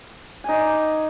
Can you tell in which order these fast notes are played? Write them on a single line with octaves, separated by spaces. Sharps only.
G#5 D#4 D5